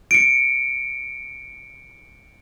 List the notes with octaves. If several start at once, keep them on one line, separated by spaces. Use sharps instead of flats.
C#7 D7